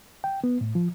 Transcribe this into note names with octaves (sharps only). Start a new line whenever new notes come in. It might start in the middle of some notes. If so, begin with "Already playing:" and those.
G5
B3
A2
F3